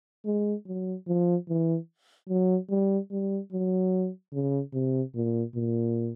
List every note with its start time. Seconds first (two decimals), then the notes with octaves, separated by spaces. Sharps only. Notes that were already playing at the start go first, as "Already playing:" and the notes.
0.26 G#3
0.66 F#3
1.07 F3
1.49 E3
2.29 F#3
2.70 G3
3.11 G3
3.52 F#3
4.33 C#3
4.73 C3
5.15 A#2
5.55 A#2